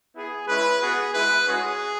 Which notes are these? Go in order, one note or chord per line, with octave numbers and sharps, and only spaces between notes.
B3 E4 G#4
G#3 C#4 E4 B4
B3 F#4 G#4
G#3 E4 B4
G#3 C#4 F#4 G#4